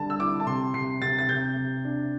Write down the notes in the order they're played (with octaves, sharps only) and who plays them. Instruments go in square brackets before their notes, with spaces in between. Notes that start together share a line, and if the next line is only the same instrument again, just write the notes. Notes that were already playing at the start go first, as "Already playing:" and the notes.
Already playing: [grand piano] D3 G3 A5
E6
E4 D6
A5
C3 C6
C3 C7
C3 A6
A6
C3 G6
C3
D4